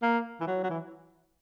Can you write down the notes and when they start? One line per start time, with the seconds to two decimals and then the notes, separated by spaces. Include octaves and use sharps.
0.02 A#3
0.41 E3
0.47 F#3
0.64 F#3
0.70 E3